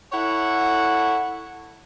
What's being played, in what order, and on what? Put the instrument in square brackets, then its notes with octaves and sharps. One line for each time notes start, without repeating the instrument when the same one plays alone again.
[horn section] E4 A4 C#5 F#5